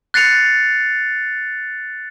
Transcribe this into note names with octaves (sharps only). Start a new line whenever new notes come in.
F#6 A6 C7 C#7 F7